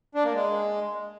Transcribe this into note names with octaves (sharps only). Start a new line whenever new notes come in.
D4
A#3
G#3